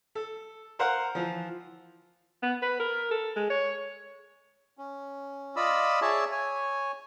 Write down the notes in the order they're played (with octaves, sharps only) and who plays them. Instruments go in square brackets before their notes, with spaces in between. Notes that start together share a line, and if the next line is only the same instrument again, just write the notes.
[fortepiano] A4
A#4 C5 F5 F#5
E3 F3
[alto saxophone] B3
B4
A#4
A4
G#3
C#5
[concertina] C#4
F4 D5 D#5 B5 E6
G#4 C#5 D5 E5 A5
C#5 G#5